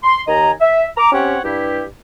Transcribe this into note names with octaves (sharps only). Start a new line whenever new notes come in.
C6
D#2 D#3 D#5 G#5 A#5
E5
A#5 D6
C4 C#4 G4 C#5 F#5 G5
G2 E4 G4